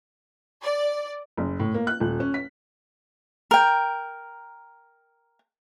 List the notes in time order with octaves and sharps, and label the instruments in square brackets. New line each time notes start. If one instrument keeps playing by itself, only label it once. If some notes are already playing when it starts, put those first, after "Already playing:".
[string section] D5
[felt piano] F#1
A2
A#3
F#6
D#1
C#4
B6
[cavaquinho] A#4 G5